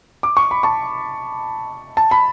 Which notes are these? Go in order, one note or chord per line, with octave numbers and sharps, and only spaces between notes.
D6
C#6
B5
A5 C#6
A5
B5